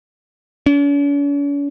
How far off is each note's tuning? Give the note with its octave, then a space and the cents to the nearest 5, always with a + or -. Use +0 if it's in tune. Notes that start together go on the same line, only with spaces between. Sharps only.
C#4 +45